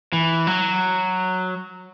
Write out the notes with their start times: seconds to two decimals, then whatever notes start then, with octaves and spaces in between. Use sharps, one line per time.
0.13 E3
0.47 F#3